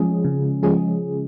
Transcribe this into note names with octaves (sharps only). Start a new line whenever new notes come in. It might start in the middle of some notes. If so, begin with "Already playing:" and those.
Already playing: F3 G#3 C#4 G#4
C#3
F3 G#3 C#4 G#4